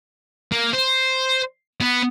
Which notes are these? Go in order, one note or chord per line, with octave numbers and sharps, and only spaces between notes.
A#3
C5
B3